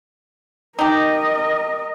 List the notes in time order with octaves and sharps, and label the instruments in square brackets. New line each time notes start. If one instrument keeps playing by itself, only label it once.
[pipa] D#4 G4 [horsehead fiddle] A#4 D#5